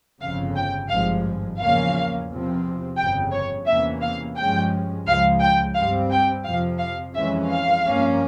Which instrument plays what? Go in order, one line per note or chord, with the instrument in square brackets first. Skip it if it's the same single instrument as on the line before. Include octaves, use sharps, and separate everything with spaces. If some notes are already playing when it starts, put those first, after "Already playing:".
[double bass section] G1 F2 C#3 [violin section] F5
[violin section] G5
[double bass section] G#1 G2 F3 G#3 [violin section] F5
[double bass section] E2 C#3 F3 A#3 C#4 [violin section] F5
[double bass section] E2 C3 F3 C4
[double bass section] G1 F2 C#3 [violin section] G5
[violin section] C#5
[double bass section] E2 C3 E3 A#3 C#4 [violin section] E5
[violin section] F5
[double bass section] G2 F3 G#3 C#4 [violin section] G5
[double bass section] C#2 C#3 F3 G#3 [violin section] F5
[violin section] G5
[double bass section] G2 G3 C4 [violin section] F5
[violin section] G5
[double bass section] F2 C3 F3 [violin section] F5
[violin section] F5
[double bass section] F2 E3 G#3 C#4 [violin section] E5
[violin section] F5
[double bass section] G2 F3 A#3 C#4